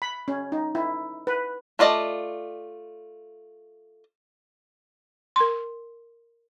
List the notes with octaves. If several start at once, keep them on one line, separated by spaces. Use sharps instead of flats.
B5
C#4
D#4
E4
B4
A3 F4 D5 D#5
A#4 C6